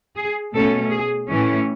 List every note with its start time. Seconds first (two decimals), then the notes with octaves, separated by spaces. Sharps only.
0.16 G#4
0.53 B2 A3 C#4 A4
0.91 G#4
1.28 A2 E3 A3 C#4